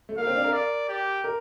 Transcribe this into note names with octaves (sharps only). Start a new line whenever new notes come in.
A3
A#3 F5
C4
D4
A#4
D5
G4
A#4